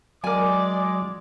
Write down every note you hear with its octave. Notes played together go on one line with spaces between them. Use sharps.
F#3 G#3 A#4 D5 G#5 D6